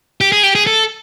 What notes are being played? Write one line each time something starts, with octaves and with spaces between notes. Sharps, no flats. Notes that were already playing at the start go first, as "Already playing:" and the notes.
G4
G#4
G4
G#4
A4